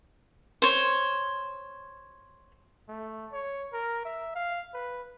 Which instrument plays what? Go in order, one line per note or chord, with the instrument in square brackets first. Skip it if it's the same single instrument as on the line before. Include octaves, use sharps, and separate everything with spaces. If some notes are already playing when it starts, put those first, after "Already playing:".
[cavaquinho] C5 C#5
[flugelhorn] A3
C#5
A#4
E5
F5
B4